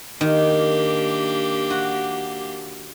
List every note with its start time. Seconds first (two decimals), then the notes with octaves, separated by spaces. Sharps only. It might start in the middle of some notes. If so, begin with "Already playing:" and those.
0.21 D#3 A#3 D4 G4
1.70 F#4